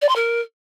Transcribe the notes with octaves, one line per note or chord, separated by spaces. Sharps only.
D5
C6
A#4